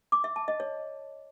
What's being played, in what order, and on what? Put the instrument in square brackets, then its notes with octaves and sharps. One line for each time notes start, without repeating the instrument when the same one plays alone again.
[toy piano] D6
E5
A5
D#5
C#5